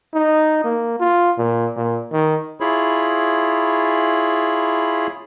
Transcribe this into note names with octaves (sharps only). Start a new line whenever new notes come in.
D#4
A#3
F4
A#2
A#2
D#3
E4 F4 G#4 C#5 B5